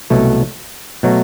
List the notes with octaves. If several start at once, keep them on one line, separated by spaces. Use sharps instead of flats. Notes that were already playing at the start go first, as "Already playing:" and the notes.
C2 B2 F#3 A3
B2 F#3 A3